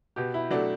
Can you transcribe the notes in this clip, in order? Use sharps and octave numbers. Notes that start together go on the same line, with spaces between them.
B2 G4
E4
F#3 A3 D4